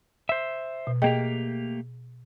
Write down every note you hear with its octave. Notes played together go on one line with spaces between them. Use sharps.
C5 E5
B2
A3 A#3 G4 G#4 D#5 G5